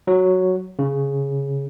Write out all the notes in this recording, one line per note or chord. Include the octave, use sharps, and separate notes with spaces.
F#3
C#3